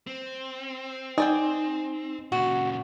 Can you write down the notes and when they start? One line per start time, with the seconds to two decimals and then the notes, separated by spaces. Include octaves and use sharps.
0.07 C4
1.18 D#4 G#4 D5 G5
2.32 A#2 C#3 F#4